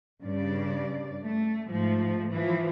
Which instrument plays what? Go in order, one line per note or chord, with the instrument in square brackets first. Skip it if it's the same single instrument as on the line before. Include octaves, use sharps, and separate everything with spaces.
[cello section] G2 C#3 D5
A3
G#2 F3 A3
E3 F3